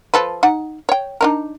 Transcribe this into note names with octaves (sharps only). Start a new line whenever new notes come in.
F3 A4 B4
D#4 F#5
C#5 G5
D4 D#4 A#4